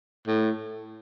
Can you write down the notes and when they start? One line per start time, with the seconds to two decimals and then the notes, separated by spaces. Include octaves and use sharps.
0.27 A2